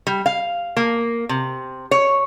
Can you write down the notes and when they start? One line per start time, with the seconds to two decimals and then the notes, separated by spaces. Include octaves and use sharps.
0.07 G3
0.26 F5
0.77 A#3
1.29 C3
1.91 C#5